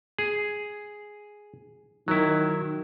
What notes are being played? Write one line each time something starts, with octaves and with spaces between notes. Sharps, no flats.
G#4
D#3 F#3 E4